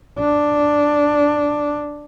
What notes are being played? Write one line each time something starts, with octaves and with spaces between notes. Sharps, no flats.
D4